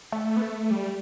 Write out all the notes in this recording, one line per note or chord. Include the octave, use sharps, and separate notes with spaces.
A3
B3
A3
G3